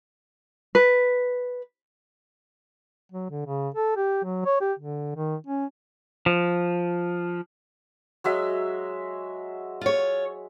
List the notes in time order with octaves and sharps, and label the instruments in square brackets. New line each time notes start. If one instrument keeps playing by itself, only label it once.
[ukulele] B4
[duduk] F#3
D3
C#3
A4
G4
F#3
C#5
G4
D3
D#3
C#4
[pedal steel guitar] F3
[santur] F#3 G#3 E5
[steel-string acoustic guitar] F4 C#5